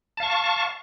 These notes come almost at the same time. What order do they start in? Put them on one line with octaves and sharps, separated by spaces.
A5 F5 C#6